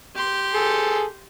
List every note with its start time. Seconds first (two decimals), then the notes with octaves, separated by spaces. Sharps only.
0.15 G4 C6
0.55 G#4 A4